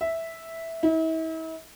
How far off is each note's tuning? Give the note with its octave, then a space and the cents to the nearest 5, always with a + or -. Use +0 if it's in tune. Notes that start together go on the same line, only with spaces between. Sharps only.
E5 -5
E4 -40